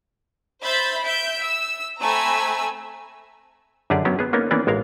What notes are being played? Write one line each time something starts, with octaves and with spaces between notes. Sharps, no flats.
C5 E5 B5 G6 A6
E5 G6 D7
E6
A3 C4 G#5 A#5 B5 E6
F#2 D3 G4 G#4 D5
F#3 B3 C#4 G4
B3 G#4
A#3 B3 C#4 D#4 A#4
E3 A#3 B3 C#4 D4 D5
A1 G#3 A#4 F5